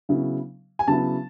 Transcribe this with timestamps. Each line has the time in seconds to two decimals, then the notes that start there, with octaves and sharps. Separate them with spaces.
0.09 C#3 F#3 B3 E4
0.79 G#5
0.88 C#3 F#3 B3 E4 A5